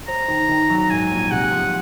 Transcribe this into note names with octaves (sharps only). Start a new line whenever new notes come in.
C5 A#5
D#3
D#3
F#3
G#2 G#5
A#1
C3 F#5
F3